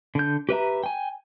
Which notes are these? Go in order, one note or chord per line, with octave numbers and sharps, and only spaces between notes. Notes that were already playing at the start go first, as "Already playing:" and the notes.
D3 G6
G4 B4 E5 A#5
G5 G#5